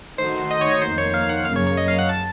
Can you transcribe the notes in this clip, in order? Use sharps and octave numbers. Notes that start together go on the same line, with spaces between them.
D#3 A3 D#4 F#4 C5
D#5
C#5
C#5
F2 D#3 A#3 D#4 C5
C#5
F5
F#5
F#2 C#3 F#3 A#3 F5
C#5
C#5
D#5
F5
F#5
A5